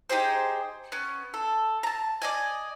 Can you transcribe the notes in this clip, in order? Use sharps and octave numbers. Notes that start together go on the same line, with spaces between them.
D#4 G4 G#4 C5
B3 C#4
A4
A5 A#5
D5 D#5 G#5